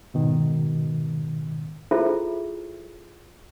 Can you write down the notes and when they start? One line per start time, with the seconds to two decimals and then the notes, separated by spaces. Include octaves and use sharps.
0.14 G#2 B2 D#3
1.91 E4 F4 G#4 A4 C5 E5